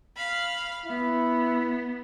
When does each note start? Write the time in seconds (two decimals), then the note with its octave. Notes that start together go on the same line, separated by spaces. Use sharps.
0.16 F5 B5
0.86 B3 E4